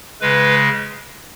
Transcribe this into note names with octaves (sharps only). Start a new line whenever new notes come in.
C#3 G#3 B4